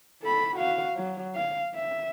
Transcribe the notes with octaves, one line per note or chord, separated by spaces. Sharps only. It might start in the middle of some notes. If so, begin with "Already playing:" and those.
A4 B5
F#4 F5
F#3
F5
E5